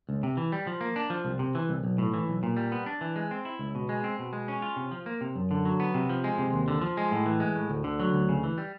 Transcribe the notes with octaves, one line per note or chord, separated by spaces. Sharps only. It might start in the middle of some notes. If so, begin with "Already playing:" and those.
C#2
C3
E3
G3
F3
A#3
D4
F3
C2
C3
E3
C2
B1
A2
E3
B1
A#2
G3
B3
D4
E3
G#3
C4
E4
C#2
B2
G#3
C4
B2
G#3
C#4
F4
C3
F3
A#3
C3
F#2
D3
F#3
B3
C3
F3
G#3
C3
D#2
D3
F3
G#3
A2
E3
G#3
A2
D2
D3
F#3
D2
C#3
E3
G3